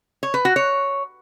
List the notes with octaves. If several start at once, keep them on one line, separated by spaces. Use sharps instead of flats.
C#5
B4
F#4
C#5